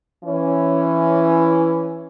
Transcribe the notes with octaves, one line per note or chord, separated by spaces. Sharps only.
E3 C#4